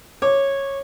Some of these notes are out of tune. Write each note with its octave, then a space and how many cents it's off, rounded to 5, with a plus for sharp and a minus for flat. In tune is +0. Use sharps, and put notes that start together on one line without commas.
C#5 -10 D6 +0